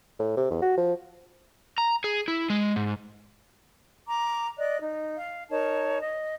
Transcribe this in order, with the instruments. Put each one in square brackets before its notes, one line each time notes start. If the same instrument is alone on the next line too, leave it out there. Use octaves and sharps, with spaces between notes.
[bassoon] A2
C3
E2
F#4
F3
[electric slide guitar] A#5
G#4
E4
G#3
G#2
[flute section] A#5 D6
D5 D#5 F#6
D#4
F5
D#4 A#4 C#5 A5
D#5